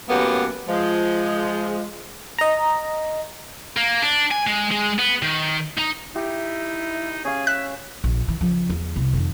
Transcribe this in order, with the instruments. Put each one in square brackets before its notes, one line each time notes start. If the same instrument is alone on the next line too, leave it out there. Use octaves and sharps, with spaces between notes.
[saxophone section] F#2 A2 A#3 B3 G4 F#5
F3 G#3
[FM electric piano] D#5 A#5
[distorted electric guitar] A#3
D4
G#5
G#3
G#3
B3
D#3
D#4
[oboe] D#4 [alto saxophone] E4 [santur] G4
[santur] C#4 F5 [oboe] G#4
[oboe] E5 [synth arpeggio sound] F#6
[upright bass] A#1
E3
C#3 F3
E2
C2
F2 D#3